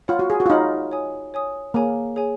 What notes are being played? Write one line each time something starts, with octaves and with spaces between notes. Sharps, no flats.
F4 C#5 F#5 B5 F6
F#4
G#4
F#4
F4
D#4 C#5 F#5 B5 F6
C#5 G#5 D#6
C#5 G#5 D#6
A#3 G#4 C#5 G#5
G#4 C#5 G#5